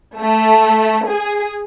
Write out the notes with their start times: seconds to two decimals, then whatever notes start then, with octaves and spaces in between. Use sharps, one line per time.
0.16 A3
1.07 G#4